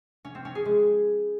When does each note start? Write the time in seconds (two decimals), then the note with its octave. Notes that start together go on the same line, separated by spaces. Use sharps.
0.25 C#4
0.35 C4
0.45 C#4
0.55 G#4
0.65 G#3